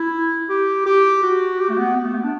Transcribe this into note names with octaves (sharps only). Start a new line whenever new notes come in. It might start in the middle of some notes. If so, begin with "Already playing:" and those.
Already playing: E4
G4
G4
F#4
G4
A3
B3
B3
A3
B3
D4